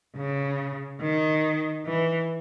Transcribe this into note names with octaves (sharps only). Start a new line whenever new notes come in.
C#3
D#3
E3